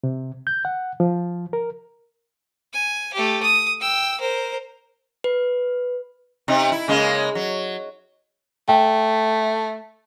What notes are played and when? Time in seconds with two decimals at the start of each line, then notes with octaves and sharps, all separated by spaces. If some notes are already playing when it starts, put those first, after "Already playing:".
0.04 C3
0.47 G6
0.65 F#5
1.00 F3
1.53 A#4
2.73 G#5
3.14 A3 G4
3.43 D#6
3.80 G5 E6
4.20 A#4 C5
5.24 B4
6.48 C3 D#4
6.72 E4
6.88 C#3 G#3 A#3
7.35 F#3
8.69 A3 G5